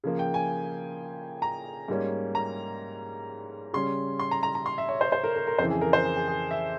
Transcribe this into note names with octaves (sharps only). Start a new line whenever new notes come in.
C#3 F3 A#3
G5
G#5
A#5
G#2 G3 A#3 C#4
A#5
C#3 G3 C#4 C6
C6
A#5
A#5
A#5
C6
E5
C#5
C5
C5
A#4
A#4
A#4
F2 C#3 E3 C5
G#4
A#4
C5
G#4
G#4
G#4
E5